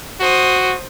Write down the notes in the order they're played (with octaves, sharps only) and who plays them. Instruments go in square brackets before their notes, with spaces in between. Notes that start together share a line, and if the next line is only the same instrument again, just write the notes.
[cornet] F#4 [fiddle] C5 D#6